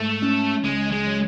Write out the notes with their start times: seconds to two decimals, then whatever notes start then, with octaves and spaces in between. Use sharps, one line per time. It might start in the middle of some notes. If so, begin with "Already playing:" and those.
Already playing: G#2 A3
0.22 C#4
0.64 C#2 G#3
0.92 G#3
1.07 F#3